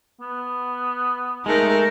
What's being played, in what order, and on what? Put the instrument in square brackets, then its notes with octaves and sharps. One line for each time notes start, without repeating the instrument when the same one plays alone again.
[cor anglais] B3
[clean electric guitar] G#3 A3 [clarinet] D#4 [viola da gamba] A4 A#4